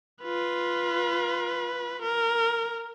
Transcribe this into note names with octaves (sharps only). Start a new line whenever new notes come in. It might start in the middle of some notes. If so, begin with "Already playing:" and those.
F4 B4
A#4